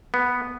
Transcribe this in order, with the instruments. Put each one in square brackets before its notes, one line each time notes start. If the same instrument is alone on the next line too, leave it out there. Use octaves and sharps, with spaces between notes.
[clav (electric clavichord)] B3